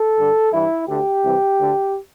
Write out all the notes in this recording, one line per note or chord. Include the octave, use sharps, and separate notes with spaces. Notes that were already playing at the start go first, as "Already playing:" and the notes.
Already playing: A4
G2 D3
G2 E3 E4
D2 D3 G4
C2 C3 E3
D2 D3